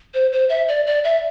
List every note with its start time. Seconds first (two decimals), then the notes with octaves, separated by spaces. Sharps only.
0.14 C5
0.32 C5
0.49 E5
0.68 D5
0.87 D5
1.04 E5